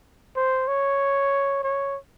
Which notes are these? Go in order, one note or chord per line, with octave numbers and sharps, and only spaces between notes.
C5
C#5
C#5